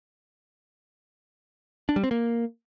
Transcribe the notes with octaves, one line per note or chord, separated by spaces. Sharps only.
D4
G3
C4
A#3